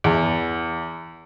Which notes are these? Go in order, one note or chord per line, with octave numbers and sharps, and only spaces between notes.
E2